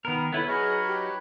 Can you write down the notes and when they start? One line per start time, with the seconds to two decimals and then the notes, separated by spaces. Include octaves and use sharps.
0.05 D#3 B3 A#4 B5
0.33 B3 E4 A4 B4 C#5
0.47 F#3 D#4 F#4 G#4 B4 C#5 F6 F#6
0.86 G4